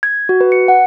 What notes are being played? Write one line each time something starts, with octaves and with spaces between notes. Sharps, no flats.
G#6
F#4
B4
C#7
F#5